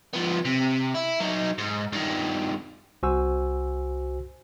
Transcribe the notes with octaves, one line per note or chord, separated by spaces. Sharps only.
F3 B3
C3
E4
F#3 D#4
G#2
G2 D#3
C2 F#4 C5 G#5 E6